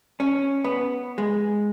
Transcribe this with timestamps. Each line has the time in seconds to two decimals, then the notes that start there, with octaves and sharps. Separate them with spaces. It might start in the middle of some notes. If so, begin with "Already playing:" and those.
0.20 C#4
0.64 B3
1.18 G#3